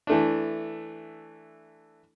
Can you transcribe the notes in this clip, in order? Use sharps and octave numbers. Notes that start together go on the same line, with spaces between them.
E3 A3 D4